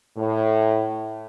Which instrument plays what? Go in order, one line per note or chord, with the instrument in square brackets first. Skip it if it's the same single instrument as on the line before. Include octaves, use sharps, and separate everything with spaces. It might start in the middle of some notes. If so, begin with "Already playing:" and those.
[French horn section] A2